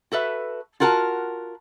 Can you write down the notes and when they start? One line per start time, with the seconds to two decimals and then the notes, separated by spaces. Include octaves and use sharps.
0.12 F#4 A4 B4 E5
0.80 F4 F#4 A#4 F#5 G5 A5